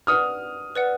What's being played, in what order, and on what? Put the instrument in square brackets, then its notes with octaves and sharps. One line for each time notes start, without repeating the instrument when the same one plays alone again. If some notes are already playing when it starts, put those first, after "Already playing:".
[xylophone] B4 D5 F#5 [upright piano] D#6 F6
[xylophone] B4 D5 F#5